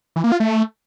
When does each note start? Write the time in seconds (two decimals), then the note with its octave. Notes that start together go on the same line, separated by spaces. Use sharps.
0.16 E3
0.24 A#3
0.32 F4
0.40 A3